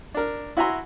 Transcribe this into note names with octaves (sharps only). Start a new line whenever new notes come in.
D4 A#4
E4 F#4 E5 G#5 A#5 C6